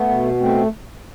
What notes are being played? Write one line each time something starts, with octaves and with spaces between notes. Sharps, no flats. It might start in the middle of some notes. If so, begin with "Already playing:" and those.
Already playing: A3 B3
B2
A3 C4